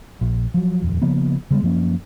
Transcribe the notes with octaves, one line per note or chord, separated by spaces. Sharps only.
A#1
F3 F#3
D#1 F2
C#3 F3 A#3 B3
C#3 G3 G#3 B3
F#2 F3 A#3 C#4